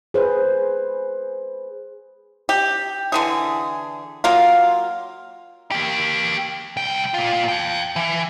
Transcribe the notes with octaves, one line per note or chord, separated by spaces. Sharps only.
G#4 B4 C5
G4
D3 E3 G#4
F#3 A#3 F4
A#3 G4
C2 G5
A#2 F4
F5 G5
E3